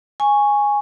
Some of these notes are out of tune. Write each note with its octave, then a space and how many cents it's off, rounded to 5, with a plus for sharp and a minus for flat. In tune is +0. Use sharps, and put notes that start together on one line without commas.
G#5 -5 C#6 +0